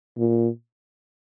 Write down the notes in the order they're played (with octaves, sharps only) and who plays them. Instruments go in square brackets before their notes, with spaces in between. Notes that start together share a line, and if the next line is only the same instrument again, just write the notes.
[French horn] A#2